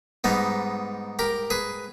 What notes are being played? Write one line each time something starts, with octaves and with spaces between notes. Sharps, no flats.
G#2 G3 B3 D#4
G4 A#4
G#4 B4